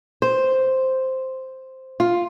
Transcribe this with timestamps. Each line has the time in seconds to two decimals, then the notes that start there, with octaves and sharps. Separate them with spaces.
0.22 C5
2.00 F4